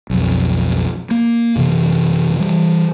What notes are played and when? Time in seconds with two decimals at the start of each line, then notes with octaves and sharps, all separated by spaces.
0.10 B1 F2
1.11 A#3
1.56 F#2 C3 E3
2.39 E3 G3